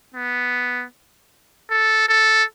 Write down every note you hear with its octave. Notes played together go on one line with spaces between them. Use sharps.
B3
A4
A4